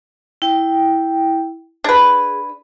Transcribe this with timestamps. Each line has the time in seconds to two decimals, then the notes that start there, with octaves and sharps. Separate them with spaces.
0.42 E4 G5
1.84 D4 G#4 B4